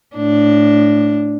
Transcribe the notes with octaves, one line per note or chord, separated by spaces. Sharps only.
A2 D4